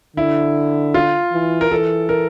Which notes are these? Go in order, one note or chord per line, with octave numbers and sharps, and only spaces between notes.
D3 E4
F4
E3
A#4
E3 A4
A#4